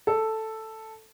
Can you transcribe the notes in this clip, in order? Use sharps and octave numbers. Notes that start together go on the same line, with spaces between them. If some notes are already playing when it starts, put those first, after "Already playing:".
A4